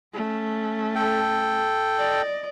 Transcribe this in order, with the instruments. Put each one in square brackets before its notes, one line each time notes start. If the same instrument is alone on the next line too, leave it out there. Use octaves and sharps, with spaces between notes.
[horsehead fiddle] A3 C#4
[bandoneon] A4 G5
[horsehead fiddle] D5 D#5